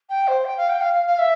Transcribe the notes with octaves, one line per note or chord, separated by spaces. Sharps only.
G5
C5
G5
F5
G5
F5
F5
F5
E5